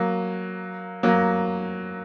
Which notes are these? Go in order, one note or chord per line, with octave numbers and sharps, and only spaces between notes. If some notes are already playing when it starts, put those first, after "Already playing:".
Already playing: F#3 A#3
F#3 A#3